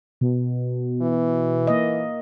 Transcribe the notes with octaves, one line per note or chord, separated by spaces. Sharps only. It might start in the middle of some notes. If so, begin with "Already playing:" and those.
B2
E3
A#3 D#5